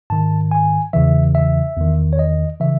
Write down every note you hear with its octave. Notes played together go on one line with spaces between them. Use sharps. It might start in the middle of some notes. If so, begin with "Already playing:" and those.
G#2 D#3 A5
G#5
E2 C#3 E3 E5
E5
E2 D#3
C#5
D#5
C#3 E3 E5